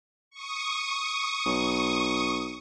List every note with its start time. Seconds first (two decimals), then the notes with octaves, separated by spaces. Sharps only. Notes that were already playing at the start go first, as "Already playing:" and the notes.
0.30 C#6 D#6
1.46 B1